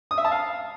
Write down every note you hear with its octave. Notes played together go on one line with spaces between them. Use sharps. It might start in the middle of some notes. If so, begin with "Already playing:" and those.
D#6
E5
A5
F5